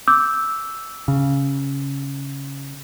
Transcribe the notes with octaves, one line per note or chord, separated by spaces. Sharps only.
D6 E6 G6
C#3